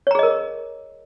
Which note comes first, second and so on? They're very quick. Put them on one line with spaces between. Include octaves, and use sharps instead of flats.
C#5 A#5 G#4 D#5 A#4